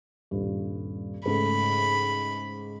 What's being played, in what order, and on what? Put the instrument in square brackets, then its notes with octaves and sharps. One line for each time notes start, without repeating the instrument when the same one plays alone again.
[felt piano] D#1 G2
[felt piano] G#2 C#3 A3 [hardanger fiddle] B5